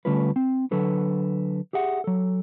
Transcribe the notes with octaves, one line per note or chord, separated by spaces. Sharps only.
D3 G3 A3 C#4 F4 B4
C4
D3 F#3 A4 B4
G4 G#4 E5 F#5
F#3 A4